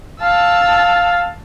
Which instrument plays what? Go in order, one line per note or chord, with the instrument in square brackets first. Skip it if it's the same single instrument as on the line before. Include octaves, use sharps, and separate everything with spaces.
[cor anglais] F5 [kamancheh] A5 E6